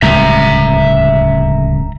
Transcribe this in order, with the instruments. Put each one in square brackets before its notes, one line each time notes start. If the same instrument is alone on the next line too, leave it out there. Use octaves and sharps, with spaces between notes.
[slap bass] D1 C#2 G2 [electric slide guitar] E5 A#5